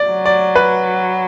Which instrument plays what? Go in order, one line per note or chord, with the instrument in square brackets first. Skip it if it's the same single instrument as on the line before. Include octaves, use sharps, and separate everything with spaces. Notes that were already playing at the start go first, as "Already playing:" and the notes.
Already playing: [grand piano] D5
[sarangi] F#3
[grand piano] D5
B4